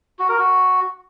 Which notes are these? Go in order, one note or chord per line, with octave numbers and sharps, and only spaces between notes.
F#4
A#4
F#4